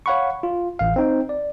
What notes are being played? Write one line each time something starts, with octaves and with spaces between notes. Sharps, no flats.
C#5 F5 F#5 B5 C#6
F4
A1 F5
C4 D#4 G5
D5